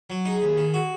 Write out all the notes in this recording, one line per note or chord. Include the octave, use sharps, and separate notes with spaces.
F#3
D#4 G#4
D#2
D#3
F#4